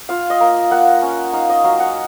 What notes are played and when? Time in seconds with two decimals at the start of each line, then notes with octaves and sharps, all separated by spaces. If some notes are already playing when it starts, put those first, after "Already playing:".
0.09 F4 F5
0.30 D#5
0.40 A#3
0.71 A#3 F#5
1.02 C#4
1.33 D#4 F5
1.49 D#5
1.64 F#3 F5
1.80 F#5